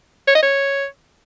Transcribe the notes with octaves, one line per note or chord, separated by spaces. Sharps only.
C#5
D#5
C#5